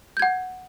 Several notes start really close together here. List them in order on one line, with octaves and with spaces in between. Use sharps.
G6 G#6 F#5